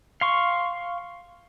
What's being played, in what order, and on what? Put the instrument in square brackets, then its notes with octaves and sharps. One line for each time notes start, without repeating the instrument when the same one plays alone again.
[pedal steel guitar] F5 C6 C#6